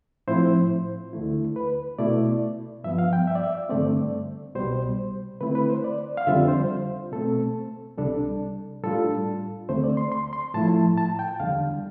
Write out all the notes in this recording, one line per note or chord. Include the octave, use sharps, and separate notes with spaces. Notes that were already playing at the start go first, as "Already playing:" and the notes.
A2 F3 C4 E4 C5
D2 D3 A3 E4
B4
B2 A3 E4 D5
G2 F3 B3 E5
F5
G5
E5
D5
E5
G2 D3 A3 C4 D5
C2 B2 G3 C5
D3 A3 C4 E4 B4
B4
C5
D5
F5
F2 D3 G3 C4 F4 E5
C5
B2 A3 C4 A4
C2 C3 G3 D4 A4
A2 G3 D4 F4 A4
D2 D3 A3 C4 C5
D5
C6
C6
C6
A2 F3 A3 E4 A5
A5
G5
E2 D3 G3 D4 F5